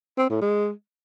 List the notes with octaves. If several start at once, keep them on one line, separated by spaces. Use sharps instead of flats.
C4
A2
G#3